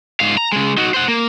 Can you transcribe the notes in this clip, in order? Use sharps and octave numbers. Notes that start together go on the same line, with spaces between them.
G#2 F5
A#5
C#3 G#3
D#4 F#4
C5 F#5
A#3